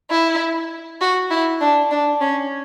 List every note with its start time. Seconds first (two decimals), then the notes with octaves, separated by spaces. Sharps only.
0.11 E4
1.01 F#4
1.31 E4
1.61 D4
1.91 D4
2.21 C#4